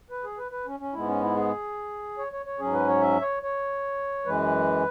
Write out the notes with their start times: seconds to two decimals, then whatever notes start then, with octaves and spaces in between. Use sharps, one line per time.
0.11 B4
0.24 G#4
0.38 B4
0.52 B4
0.66 C#4
0.80 C#4
0.93 G#2 G#3 B3 E4
1.07 C#4
1.21 E4
1.36 G#4
2.18 C#5
2.33 C#5
2.46 C#5
2.59 G#2 F#3 C#4 G#4
2.73 B4
2.87 C#5
3.01 E5
3.21 C#5
3.43 C#5
4.26 F#2 E3 G#3 B4